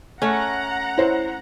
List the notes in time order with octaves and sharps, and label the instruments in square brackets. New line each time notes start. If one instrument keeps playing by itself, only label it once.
[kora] A3 C#4 [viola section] F#5 A#5
[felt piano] E4 C5 C#5